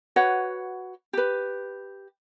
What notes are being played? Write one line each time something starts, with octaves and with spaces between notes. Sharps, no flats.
F#4 B4 C#5 F#5
G4 B4